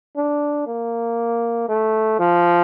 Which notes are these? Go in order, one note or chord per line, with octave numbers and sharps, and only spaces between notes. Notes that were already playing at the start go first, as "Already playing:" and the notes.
D4
A#3
A3
F3